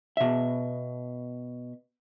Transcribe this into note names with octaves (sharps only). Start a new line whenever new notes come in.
B2 E5